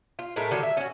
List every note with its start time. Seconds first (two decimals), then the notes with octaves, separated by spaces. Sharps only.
0.19 F4
0.36 A2 G#3 A3 A#4
0.51 D3 D#3 F#3
0.63 E5
0.77 C#4 F#4